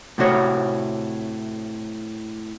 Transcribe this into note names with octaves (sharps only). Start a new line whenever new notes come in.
A2 C3 F#4 C#5